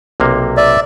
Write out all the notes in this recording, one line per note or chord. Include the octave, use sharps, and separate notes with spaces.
B1 C3 A#3
D5 E5